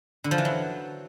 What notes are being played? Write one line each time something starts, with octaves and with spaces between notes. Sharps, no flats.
D3
F3
E3
F#3